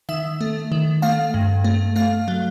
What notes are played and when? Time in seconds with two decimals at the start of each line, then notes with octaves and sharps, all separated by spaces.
0.09 D#3 E5
0.41 A3
0.72 D#3
1.02 A3 F5
1.34 G2
1.64 A3
1.96 A3 F5
2.28 F#3